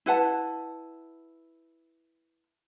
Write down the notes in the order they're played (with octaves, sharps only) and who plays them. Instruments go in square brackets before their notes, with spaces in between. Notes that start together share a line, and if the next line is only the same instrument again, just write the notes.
[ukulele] E4 B4 F#5 A5